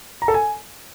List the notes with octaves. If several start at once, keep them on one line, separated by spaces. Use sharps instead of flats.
A#5
A4
G#5